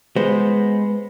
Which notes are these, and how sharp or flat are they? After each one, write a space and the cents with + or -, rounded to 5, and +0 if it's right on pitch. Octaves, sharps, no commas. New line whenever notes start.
G#3 +0 B3 +0 C5 +0